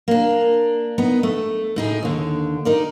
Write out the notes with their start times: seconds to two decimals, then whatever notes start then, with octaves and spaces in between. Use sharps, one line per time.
0.08 A#3 D4
0.98 B3 D#4
1.23 A3
1.76 A2 D#4 G#4
2.03 D#2 D3
2.65 D#4 A#4 D5